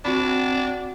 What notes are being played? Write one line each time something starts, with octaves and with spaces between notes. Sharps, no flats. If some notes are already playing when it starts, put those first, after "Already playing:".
C4 D4 F#4 B5